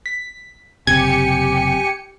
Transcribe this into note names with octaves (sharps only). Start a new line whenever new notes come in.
B6
F#1 C3 G4 G#5 G#6 C#7